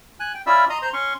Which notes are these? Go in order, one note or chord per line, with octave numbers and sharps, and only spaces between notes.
G#5 F#6
G5
C#4 E4 F4 D5 E5 E6
D#5 A#5 C6 D#6
C5 A#5 C6
C#4 C6 C#6